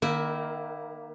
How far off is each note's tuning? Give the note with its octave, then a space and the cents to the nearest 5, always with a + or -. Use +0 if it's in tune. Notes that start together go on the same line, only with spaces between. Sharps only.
D#3 -25 A#3 +15 E4 +0